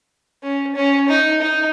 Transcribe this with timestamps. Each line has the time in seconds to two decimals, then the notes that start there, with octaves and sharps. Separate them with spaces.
0.42 C#4
0.75 C#4
1.08 D#4
1.41 D#4